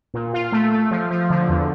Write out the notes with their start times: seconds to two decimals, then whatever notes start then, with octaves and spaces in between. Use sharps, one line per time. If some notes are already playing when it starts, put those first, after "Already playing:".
0.14 A#2
0.33 F4
0.52 A3
0.72 A3
0.91 F3
1.11 F3
1.30 D3
1.49 E2